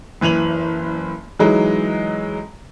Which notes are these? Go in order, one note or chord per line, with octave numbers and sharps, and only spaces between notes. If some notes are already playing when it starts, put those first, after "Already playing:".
F#1 E3 D#7 F7 F#7
E3 F#3 G#3 D#4